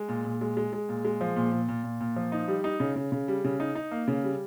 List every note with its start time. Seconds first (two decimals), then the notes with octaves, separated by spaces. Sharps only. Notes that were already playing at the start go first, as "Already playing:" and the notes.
Already playing: G#3
0.09 A#2
0.25 A#2
0.41 G#3
0.57 G#3
0.73 G#3
0.89 A#2
1.05 G#3
1.21 F3
1.37 A#2
1.52 A#2
1.69 A#2
1.84 A#2
2.01 A#2
2.16 F3
2.32 D#4
2.48 G3
2.64 D#4
2.80 C#3
2.96 C#3
3.12 C#3
3.28 G3
3.44 C#3
3.60 D#4
3.75 D#4
3.91 A#3
4.08 C#3
4.24 G3